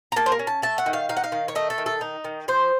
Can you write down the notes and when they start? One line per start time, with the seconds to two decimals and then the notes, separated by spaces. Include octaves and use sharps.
0.12 A#5
0.16 A#3 A5
0.26 C5
0.32 A#4
0.39 C#4
0.47 A5
0.62 A3 A5
0.78 F#5
0.86 D#3
0.93 F5
1.09 D#4 F5
1.17 F#5
1.24 F5
1.32 D#3
1.48 C#5
1.55 A3 D#5
1.70 A4
1.78 D#3
1.86 A4
2.01 D#4
2.24 D#3
2.48 F3 C5